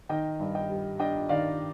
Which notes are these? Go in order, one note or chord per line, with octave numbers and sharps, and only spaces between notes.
D#3 D#5 G5
G2
D#5 G5
G3
D4 D#5 G5
D#3 D5 F5